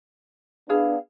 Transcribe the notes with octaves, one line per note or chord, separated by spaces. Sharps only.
B3 D4 E4 G#4 F5